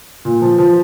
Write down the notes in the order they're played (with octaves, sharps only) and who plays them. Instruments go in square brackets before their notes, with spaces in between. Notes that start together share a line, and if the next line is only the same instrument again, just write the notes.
[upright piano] A#2
F3
F3